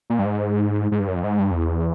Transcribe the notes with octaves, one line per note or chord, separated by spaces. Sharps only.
A#2
G2
G#2
G#2
G2
F#2
F2
G#2
G2
F2
E2